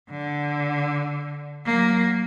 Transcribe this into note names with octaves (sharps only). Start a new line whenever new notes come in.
D3
F#3 A#3